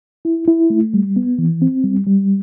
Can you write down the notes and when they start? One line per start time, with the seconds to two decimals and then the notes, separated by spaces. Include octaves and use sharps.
0.25 E4
0.48 E4
0.70 A3
0.94 G3
1.16 B3
1.38 E3
1.62 C4
1.84 G3
2.07 G3